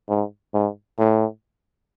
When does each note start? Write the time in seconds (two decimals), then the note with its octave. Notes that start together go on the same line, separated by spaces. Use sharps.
0.09 G#2
0.54 G#2
0.98 A2